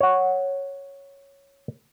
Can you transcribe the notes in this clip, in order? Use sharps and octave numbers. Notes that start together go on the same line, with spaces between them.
C#5 F#5